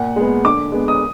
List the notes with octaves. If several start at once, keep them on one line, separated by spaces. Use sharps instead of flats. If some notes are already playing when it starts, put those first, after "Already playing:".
Already playing: A#2 F#5
G#3 B3
D3 D6
G#3 B3
D#6